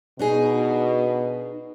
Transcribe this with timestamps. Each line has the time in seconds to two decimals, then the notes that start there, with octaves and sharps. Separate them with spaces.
0.19 B2 D4 D#4 G#4